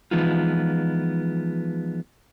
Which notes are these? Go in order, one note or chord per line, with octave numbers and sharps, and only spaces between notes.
E3 F3 G#3 B3 D#4 F4